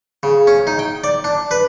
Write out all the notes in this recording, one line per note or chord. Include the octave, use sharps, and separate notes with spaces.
C#3
C#4
D#4
G5
D5
D4
B4